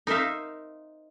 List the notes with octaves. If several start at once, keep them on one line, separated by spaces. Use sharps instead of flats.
D#4 A#4 C5 E5 F5